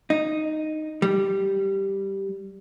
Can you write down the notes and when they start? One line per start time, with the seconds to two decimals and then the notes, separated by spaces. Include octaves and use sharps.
0.10 D#4
1.02 G3